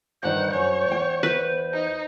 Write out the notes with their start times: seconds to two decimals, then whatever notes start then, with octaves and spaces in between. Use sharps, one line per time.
0.23 E2 G2 D#3 C5 F#5
0.53 F#2 C5 C#5
0.88 E2 G5
1.23 B4
1.74 D#4